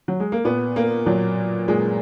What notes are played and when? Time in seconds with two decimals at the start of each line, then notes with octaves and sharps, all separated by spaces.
0.08 F#3
0.20 G#3
0.32 A#3
0.45 A#2 B3
0.76 A#3
1.06 A#2 F#3
1.68 A#2 G#3